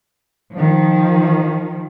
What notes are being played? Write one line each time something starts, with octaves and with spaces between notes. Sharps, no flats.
D#3 F3